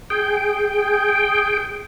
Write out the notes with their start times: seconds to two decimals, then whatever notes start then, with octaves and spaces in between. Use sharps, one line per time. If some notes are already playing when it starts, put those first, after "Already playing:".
0.10 G#4 G5